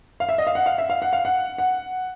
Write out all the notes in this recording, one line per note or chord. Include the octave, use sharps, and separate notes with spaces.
F5
E5
D#5
F5
F#5
F5
E5
F5
F#5
F5
F#5
F#5